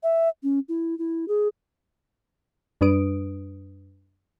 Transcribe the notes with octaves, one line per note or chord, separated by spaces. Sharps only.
E5
C#4
E4
E4
G#4
F#2 G3 D4 B4 D#6 D7